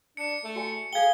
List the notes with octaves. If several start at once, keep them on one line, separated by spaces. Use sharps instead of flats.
D4 C#7
A3
F#4 D5 G#5
G#4 A4 F5 G5 G#6 G7